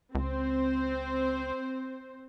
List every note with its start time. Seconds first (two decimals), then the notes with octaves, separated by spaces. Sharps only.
0.15 C#2 C4 C5